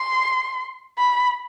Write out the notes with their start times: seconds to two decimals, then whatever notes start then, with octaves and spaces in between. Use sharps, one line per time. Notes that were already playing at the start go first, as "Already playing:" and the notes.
Already playing: C6
0.98 B5